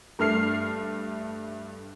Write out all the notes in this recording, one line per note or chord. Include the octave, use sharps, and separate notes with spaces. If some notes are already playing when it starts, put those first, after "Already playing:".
G2 A3 F6 C7